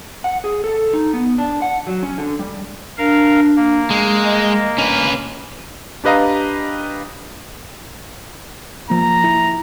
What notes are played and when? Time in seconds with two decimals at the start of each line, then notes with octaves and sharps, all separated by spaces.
0.24 F#5
0.44 G#4
0.64 A4
0.93 D#4
1.13 B3
1.38 D4
1.62 F#5
1.87 F#3
2.03 C#4
2.18 D3
2.39 G3
2.98 D4 A#4 F5
3.56 A#3
3.90 G#3
4.25 D#5
4.78 C#4 B4
6.04 D4 G4 B4 D#5 F5 A#5
8.90 F3 A#3 A#5
9.24 E4